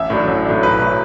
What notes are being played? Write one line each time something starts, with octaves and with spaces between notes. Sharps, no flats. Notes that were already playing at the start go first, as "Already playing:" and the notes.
Already playing: A1 E5
A2 F#3 D4
A1
A2 F#3 D4
B1 B4
A2 F#3